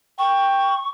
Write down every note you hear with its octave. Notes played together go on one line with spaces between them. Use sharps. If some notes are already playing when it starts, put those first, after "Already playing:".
G5 C#6